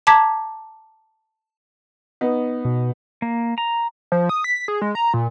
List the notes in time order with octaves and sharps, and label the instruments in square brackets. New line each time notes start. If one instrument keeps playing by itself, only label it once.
[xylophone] A5 A#5 D6 G#6 B6
[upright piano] B3 D#4
[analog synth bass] B2
[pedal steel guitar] A#3
A#5
[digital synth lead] F3
D#6
B6
G#4
G#3
A#5
A#2